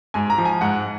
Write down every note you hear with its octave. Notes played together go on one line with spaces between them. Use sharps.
G#2 G#5
A#5
F3
G#5
G#2 F#5